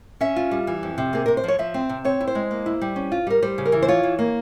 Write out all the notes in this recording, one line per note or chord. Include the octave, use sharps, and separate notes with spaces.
C#4 E5
F4
G3
E3
F2
C3
A#3 G#4
C3 A#4
C5
F3 C#5
F3 E5
C4
C3
C4 C#5
E4
C5
G#3
A#3
E4
G3
C#4
F4
G3 A#4
G3 C5
C#3
A#4
E3
C5
F4 C#5
E3
A#3